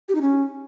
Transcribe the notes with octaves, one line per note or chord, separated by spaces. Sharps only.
G4
D#4
C#4